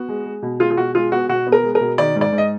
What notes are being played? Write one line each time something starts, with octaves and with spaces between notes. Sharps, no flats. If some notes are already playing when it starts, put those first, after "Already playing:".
Already playing: B3 F#4
G#3
G#3
B2
G#3 F4
F4
B2 F#4
G#3 F4
B3 F#4
B2 F#4
B3
A#4
G#3
A#4
B2
D#3 D5
G#2
D5
G#2
D#5